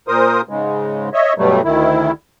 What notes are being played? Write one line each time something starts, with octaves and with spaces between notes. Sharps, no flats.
A#2 A#4 C5 D#6
G#2 C#3 G#3
C#5 D#5 E5
G2 B2 F#3 G3 A3
D2 D#3 E4